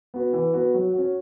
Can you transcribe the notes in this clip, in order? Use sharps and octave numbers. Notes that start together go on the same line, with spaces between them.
B3 F#4
E3
B3 F#4
F#3
C#4 F#4